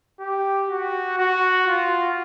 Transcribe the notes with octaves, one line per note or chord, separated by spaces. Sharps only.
G4
F#4
F#4
F4